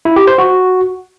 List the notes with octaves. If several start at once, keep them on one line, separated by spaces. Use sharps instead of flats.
E4
G4
C5
F#4